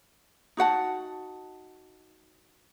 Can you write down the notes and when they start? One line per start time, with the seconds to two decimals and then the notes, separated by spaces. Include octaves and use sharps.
0.57 D#4 F#4 F#5 A5